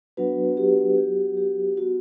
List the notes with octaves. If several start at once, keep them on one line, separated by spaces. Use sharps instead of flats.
F#3 B3 D4 F#4 B4
F#4
G4
F#3 B3 F#4 G4
G4
B3 F#4